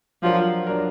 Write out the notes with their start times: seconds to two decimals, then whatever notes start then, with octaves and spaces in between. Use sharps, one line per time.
0.23 F3 F#3 D4 F#4 A#4
0.67 F#3 D4 F#4 A#4